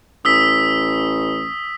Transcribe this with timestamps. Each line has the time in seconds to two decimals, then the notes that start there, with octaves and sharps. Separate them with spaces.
0.25 A1 D#6 E6 B6